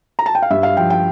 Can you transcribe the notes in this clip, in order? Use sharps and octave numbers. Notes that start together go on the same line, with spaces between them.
A#5
A5
G5
F5
G2 E5
F5
F3 G5
G5